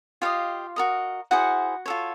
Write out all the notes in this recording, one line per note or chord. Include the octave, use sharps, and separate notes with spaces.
F4 G4 C5 D#5 F5
F#4 A#4 D#5
E4 F#4 G#4 C5 F#5
F4 A4 C#5